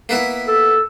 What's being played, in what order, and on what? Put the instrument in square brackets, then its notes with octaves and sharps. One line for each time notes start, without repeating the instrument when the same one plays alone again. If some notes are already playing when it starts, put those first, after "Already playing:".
[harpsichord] A#3 B3 E4
[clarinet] A4